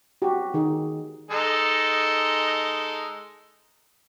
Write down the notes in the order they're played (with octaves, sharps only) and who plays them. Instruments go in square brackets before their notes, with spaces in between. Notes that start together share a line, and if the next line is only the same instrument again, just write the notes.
[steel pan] F#4 G4
D#3 D#4 G#4
[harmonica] G#3 D#4 A4